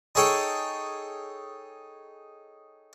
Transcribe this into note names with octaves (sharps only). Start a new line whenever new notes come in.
D#4 G#4 A4 C#5 G5